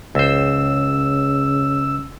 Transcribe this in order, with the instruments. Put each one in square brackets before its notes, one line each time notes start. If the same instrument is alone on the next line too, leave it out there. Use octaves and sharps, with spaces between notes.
[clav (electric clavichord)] C#2 C5 [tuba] C#3 [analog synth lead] E6